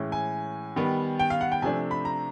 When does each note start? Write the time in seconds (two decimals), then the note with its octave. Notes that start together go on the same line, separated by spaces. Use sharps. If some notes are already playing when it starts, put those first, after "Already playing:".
Already playing: A2 E3 G#3 C#4
0.12 G#5
0.76 D#3 G3 B3
1.19 G5
1.30 F5
1.41 F#5
1.52 G5
1.62 C3 F3 A3 D4 G#5
1.91 B5
2.05 A#5